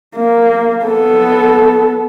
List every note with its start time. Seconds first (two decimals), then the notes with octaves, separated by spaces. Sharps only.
0.16 A#3
0.85 B3 A4